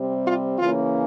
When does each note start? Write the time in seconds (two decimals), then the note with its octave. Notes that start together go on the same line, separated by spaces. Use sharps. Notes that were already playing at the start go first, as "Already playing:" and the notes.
Already playing: C3 G3 C4
0.24 F4
0.59 C#3 E3 A#3 C#4 F4